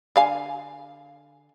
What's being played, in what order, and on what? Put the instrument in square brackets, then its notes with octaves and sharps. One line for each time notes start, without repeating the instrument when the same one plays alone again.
[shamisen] D3 F5 G#5